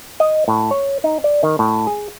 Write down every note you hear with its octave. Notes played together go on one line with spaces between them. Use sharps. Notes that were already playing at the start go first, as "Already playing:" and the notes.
D#5
A2
C#5
D#4
D5
D#3
A2
G#4